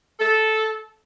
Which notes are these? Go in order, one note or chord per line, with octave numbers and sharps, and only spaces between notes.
A4